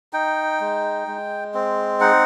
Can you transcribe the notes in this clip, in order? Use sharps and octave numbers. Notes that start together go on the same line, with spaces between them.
D#4 G5
G#3
G#3
C4
D#4 F#5